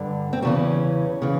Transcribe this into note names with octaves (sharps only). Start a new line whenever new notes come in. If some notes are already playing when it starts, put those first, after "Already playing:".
Already playing: G2 D3
C4
E2 C#3 E3 C#4
C#3 E3